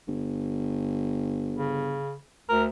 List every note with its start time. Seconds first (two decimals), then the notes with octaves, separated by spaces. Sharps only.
0.07 G1
1.57 C#3
2.49 D2 A#4